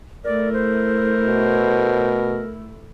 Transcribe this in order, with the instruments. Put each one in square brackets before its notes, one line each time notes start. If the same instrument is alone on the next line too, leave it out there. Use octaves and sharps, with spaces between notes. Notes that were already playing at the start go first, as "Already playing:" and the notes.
[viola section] A3 E4 [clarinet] A#4 [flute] D5
[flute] C5
[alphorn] B2